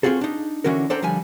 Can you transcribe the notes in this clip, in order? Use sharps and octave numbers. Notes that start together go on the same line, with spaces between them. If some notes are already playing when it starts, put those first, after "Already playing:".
C4 F4 F#4 G#4 A4
D4 D#4
D3 E3 C#4 F#4 A#4
D4 A4 C5 F#5 G5 A#5
D3 F3 G3 G#5